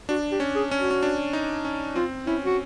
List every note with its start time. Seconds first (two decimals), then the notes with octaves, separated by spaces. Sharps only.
0.09 D4 F#4
0.32 G4
0.40 C#4
0.55 G#4
0.71 C#4
0.79 F#4
0.91 C#4
1.03 D4
1.33 D#4
1.65 C#4
1.96 C4 F4
2.27 C#4 E4
2.46 F#4